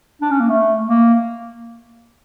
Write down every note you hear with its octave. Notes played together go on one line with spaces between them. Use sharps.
D4
C#4
A#3
A3
A#3